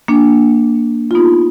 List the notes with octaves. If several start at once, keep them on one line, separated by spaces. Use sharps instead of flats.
A#3 D4
F4
B3 D#4